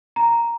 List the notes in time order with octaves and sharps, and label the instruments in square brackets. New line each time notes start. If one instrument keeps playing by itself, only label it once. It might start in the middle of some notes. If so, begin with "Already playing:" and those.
[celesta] A#5